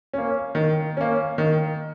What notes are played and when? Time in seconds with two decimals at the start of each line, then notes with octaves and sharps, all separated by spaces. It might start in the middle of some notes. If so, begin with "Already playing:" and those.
0.13 A#3 C#4
0.55 D#3
0.97 A#3 C#4
1.38 D#3